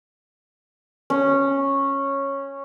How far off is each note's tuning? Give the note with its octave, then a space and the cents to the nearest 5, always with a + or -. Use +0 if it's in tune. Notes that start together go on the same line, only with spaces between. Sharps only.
C#4 -10